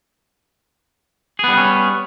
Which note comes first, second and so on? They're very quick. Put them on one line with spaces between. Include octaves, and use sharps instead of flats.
G#4 B3 G3 D#4 C#4